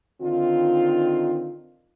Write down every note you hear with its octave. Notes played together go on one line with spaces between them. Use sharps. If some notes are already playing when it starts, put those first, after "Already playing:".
D3 D#3 C4 D#4 F4